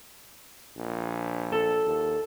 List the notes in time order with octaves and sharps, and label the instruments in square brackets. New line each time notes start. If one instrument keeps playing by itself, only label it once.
[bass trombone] A#1
[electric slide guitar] A4
[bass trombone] D#2